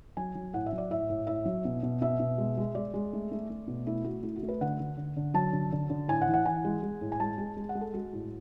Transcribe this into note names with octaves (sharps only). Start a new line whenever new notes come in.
F#3 G#5
F#3
A2 F#5
E5
F#3
D5
A2 E5
A2
A2 E5
F#3
B2
B2
B2 E5
B2
G#3
G#3
G#3 D5
G#3
A3
A3
A3
B2
A3 E4
A3 F#4
A3 E4
F#4
A3
B4
D3 F#5
D3
D3
D3
F#3 A5
D3
D3
D3
A2 G#5
F#5
E3
F#5
E3 G#5
G#3
G#3
A2
G#5
G#3 A5
G#3
G#3
F#5
G#3
A4
G#3 F#4
A2